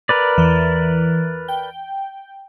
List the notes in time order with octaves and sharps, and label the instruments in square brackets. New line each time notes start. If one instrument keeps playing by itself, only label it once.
[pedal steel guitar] A#4 B4 D5
[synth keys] E2 E3
G5